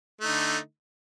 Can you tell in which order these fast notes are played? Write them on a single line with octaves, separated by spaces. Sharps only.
A3 D#4 D3